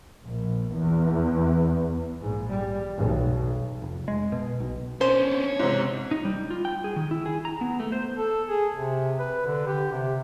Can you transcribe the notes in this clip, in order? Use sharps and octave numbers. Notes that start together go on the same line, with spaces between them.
A#1
E2
A#1 G#2
G3
B1
F1
G#3
B2
B1
C#4 D4 C5
C#5
G#2 C3
D#4
G3
F4
G5
G#4
D#3
E4
G#4
A#5
B3
A3
C5
A4
G#4
C3
B4
D3
G4
C3